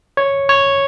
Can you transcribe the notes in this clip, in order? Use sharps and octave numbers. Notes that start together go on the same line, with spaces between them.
C#5
C#5